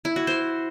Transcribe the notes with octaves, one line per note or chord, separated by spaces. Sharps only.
E4
F#4
C5